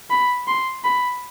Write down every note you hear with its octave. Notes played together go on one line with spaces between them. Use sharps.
B5
C6
B5